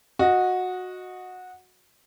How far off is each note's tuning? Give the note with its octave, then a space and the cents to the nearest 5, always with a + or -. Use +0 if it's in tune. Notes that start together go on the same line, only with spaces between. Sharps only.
F#4 -15 D#5 +0